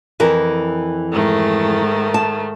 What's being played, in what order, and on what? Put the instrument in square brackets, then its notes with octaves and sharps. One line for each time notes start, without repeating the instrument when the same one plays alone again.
[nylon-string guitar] F2 E3 A#4
[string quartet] G#2 D#3 A3
[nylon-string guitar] A5